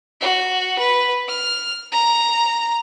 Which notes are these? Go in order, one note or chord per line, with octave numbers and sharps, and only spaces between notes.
F#4
B4
F6
A#5